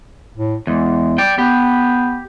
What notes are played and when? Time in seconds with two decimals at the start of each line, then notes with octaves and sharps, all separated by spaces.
0.36 A2
0.67 E2 G#3
1.18 D5 G5
1.38 B3 G4